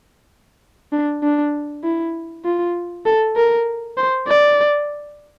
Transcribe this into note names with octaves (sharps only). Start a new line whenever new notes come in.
D4
D4
E4
F4
A4
A#4
C5
D5